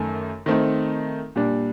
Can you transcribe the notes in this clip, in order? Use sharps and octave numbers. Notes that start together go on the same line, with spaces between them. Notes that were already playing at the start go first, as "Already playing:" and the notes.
Already playing: F#2 D#3 A3
D#3 A3 C4 D#4
A#2 G3 D4